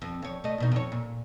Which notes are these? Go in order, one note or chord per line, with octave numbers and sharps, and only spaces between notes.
F2
F2 C#5
A3 D#5
E2 B2 D#4
F2 C#5
A#2